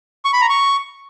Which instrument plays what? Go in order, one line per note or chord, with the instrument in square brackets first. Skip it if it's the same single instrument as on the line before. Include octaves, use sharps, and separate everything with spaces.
[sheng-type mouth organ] C#6
B5
A#5
C#6